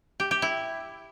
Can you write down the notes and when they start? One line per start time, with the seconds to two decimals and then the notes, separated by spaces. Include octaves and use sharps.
0.20 G4
0.31 G4
0.42 E4